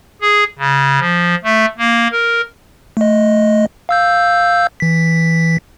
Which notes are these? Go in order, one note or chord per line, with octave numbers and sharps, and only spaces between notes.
G#4
C#3
F3
A3
A#3
A#4
A3 D#5
F5 E6 G6
E3 B6